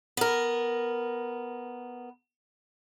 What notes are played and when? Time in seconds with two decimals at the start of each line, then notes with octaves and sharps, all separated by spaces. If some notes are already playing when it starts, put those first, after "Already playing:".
0.17 B3 A#4